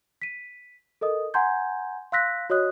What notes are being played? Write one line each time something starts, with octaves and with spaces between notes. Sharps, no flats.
B6 D#7
A4 A#4 D#5 D#6
F#5 G#5 A#5 C6 G6 G#6
F5 C6 E6 F#6 A#6 B6
F#4 C#5 D#5 D#6 F#6